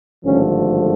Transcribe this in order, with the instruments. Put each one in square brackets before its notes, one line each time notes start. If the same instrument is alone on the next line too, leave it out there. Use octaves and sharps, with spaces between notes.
[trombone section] G#1 G2 D3 F3 A3 C#4